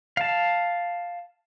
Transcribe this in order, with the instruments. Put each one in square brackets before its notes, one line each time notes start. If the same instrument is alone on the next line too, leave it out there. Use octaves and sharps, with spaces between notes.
[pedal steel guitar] F5 A5